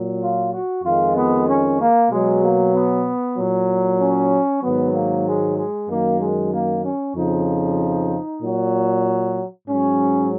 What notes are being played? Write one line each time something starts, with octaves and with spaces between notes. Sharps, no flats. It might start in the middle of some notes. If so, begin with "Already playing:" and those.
Already playing: A#2 F#3
F4
F#4
F2 D#3 G#3 F4
B3
C#4
A#3
B2 F#3 G#3
A#3
B3
A#2 F#3
C#4
G#2 D#3 F#3 B3
A#3
G#3
G#3
F#2 D#3 F#3 A#3
G#3
A#3
C#4
F2 C#3 F3 D#4
A#2 F#3
G#2 F#3 C#4